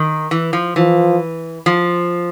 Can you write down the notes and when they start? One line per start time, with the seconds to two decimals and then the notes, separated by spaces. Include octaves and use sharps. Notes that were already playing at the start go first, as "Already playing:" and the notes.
Already playing: D#3
0.31 E3
0.53 F3
0.76 E3 F3
1.66 F3